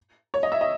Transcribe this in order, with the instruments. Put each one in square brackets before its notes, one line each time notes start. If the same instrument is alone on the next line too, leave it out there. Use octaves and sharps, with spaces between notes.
[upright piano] C#5
D#5
E5
D#5